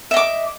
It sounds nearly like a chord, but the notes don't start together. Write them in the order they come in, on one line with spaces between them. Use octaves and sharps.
E5 D#5 D6